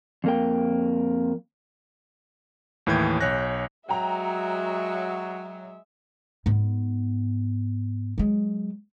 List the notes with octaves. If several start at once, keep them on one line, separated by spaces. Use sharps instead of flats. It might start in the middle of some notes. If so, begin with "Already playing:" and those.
F2 A#3 G5
D#2 A2 E3 G5 G6 G#6
B1 C#5 G#5 F#6 A#6
F#3 G#3 E5 G5 A#5
G#2 B3
F#3 G#3